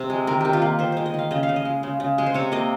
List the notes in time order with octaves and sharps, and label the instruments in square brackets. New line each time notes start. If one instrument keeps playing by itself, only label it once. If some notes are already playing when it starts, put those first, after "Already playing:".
Already playing: [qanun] C3 D#3 C5
G#3
D#3 A#4
D#3 G4
F4
A#3
D#3 C5
G#3 C5
D#5
D#3 F5
C#3 D#5
F5
C#3
D#5
G#3
C#3
C#3
G#3
C5
C3 C#5
A#3 D#5